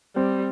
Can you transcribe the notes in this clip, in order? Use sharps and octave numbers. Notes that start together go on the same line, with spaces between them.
G3 C4